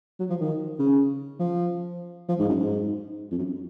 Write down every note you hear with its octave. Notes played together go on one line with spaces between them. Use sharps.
F#3
F3
D#3
C#3
F3
F3
G#2
F#2
G#2
F2
F#2